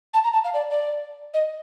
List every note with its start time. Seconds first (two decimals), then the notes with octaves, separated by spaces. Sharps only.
0.13 A5
0.24 A#5
0.33 A5
0.44 F5
0.54 D5
0.70 D5
1.34 D#5